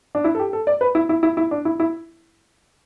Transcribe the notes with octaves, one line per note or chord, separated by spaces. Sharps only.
D4
E4
A4
G4
A4
D5
B4
E4
E4
E4
E4
D4
E4
E4